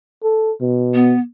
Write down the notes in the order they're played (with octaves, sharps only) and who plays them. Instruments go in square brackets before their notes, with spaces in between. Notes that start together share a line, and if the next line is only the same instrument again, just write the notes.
[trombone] A4
B2
[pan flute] B3